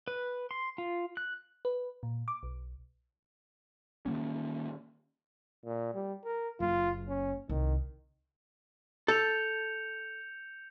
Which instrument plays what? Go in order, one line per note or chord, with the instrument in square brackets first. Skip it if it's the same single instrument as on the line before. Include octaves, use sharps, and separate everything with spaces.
[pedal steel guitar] B4
C6
F4
F#6
[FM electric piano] B4
A#2
D6
B1
[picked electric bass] D#3 F3 A#3 C#4
[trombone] A#2
G3
A#4
[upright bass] F#1 [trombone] F4
[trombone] C#4
[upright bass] C2 [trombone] D#3
[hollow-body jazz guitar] A4 [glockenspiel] G6 C#7 F7